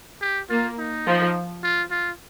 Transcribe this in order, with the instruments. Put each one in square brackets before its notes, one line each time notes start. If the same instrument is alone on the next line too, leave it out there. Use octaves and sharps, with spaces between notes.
[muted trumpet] G4
[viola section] A#3 [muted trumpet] F4
[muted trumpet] D#4
[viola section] F3
[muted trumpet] F4
F4